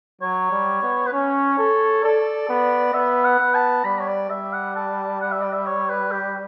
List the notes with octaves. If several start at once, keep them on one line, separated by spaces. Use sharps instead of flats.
F#3 C#5
G3
B3
B4
C#4 C#5
A4
A4 D5
B3
B3 E5
F#5
B3
A5
G3 B5
C#5
D5
G3 E5
F#5
A5
F#5
E5
D5
E5
C#5
B4
G4